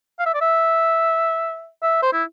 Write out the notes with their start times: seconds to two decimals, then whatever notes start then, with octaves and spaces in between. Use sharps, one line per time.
0.19 F5
0.26 E5
0.34 D5
0.41 E5
1.82 E5
2.02 C5
2.13 E4